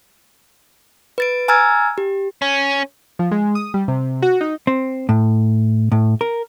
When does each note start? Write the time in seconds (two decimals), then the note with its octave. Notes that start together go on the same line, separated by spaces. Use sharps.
1.18 B4 A6 D7
1.48 G#5 A#5 E6 F6 G#6 A6
1.98 G4
2.42 C#4
3.19 F3
3.31 G#3
3.55 D#6
3.74 G3
3.88 C3
4.22 F#4
4.41 D#4
4.67 C4
5.09 A2
5.92 A2
6.21 A#4